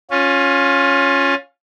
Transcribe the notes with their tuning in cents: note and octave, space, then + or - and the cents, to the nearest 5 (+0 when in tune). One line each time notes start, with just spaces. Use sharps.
C#4 +0 F4 +20